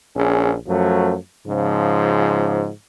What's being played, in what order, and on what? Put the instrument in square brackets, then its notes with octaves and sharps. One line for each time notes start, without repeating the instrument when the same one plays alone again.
[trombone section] A#1 C#4 G#4
F#2 F3 F#3 A3
G#2 C#3 F3